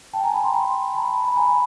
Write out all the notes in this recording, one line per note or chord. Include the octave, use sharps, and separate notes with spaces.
G5 A5
G#5 A#5
A5 B5
A#5 C6
A#5 C6
A5 B5
B5
G#5 A#5